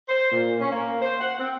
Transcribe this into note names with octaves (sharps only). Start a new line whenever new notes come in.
C5
A#2
C#4
A#3
C5
F#5
C4